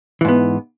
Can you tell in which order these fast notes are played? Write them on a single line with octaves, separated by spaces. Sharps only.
E3 G#2 B3